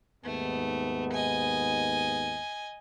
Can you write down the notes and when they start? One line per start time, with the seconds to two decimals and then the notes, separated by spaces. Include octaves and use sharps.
0.24 D#2 G#2 A3 B3
1.12 D#5 G#5